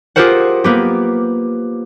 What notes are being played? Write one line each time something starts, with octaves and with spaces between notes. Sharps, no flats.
F4 G4 G#4 A#4 C5 F#5
A#3 B3 G4